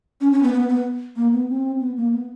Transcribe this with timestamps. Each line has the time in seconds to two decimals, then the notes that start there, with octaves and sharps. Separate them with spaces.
0.21 C#4
0.32 C#4
0.43 B3
0.54 B3
0.69 B3
1.16 A#3
1.33 B3
1.49 C4
1.80 B3
1.97 A#3
2.13 B3